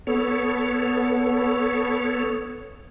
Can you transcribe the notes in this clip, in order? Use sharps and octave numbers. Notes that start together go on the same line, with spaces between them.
B3 A4 C#5